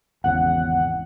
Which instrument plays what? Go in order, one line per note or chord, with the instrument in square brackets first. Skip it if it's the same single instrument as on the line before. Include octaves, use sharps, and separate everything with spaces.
[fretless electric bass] G#1 E2 C#3 [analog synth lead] F#5